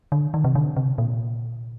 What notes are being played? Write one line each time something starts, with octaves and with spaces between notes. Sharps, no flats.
D3
D#3
C3
D3
C3
A#2